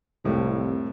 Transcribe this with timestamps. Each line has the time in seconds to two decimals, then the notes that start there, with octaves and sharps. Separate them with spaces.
0.25 C2 F2 A2 C3